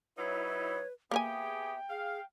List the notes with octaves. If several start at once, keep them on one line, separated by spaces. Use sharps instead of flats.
F#3 D#4 E4 B4 C#5
A#3 B3 G4 G#4 A#4 E5 G5 G#5
G#4 F5